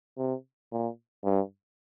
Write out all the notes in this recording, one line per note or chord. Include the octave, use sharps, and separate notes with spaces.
C3
A#2
G2